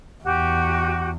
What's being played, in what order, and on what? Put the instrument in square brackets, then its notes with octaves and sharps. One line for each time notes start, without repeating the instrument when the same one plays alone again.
[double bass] E2 [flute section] F#4 G4